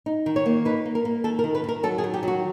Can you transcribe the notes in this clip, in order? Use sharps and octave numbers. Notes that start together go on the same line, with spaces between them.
D#4
D#3
C#5
A#3
D#4 B4
A#3
A#4
A#3
D#3 A4
A#4
D#3
B4
D#3 A#4
F#3 A4
G#4
D#3
G4
F#3 F#4